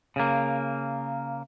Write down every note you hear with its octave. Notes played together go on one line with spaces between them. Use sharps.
C#3 A#3